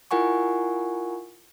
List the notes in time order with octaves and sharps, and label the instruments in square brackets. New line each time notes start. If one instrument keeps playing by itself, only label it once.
[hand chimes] E4 F4 A#4 F#5 G#5 C#6